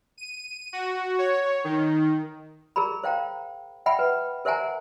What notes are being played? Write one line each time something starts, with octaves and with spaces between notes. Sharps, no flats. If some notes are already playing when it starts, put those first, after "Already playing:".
D#7
F#4
C#5
D#3
G#4 A#4 A#5 B5
C5 F5 G5 A#5
E5 F#5 G5 B5
B4
A#4 C5 E5 F#5 G#5 A#5